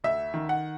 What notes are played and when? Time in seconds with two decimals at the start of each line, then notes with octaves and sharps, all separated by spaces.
0.04 D2 E5
0.34 D#3
0.49 F#5